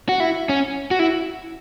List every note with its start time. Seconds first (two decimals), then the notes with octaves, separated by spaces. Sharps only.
0.09 F#4
0.20 E4
0.49 C#4
0.91 F#4
0.99 E4